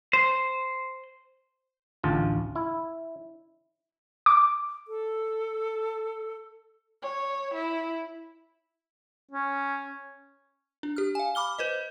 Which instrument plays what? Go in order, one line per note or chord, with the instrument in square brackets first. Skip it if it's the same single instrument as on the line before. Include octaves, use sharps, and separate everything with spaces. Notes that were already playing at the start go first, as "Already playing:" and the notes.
[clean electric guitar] C5
[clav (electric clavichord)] A1 D2 F4 A5
E4
[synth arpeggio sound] D6
[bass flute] A4
[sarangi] C#5
E4
[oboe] C#4
[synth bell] D4
G4 F6
F5 G#5
B5 D6 F6 G7
B4 C5 D#5